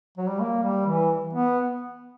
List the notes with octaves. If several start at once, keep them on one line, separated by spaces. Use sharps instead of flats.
F#3
G3
A#3
G3
E3
B3